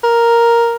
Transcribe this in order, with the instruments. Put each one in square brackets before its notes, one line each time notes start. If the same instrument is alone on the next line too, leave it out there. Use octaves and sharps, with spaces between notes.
[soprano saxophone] A#4